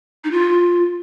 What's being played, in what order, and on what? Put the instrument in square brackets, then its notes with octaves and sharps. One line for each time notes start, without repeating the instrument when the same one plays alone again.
[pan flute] D#4
F4